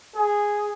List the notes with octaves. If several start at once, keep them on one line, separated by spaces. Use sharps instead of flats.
G#4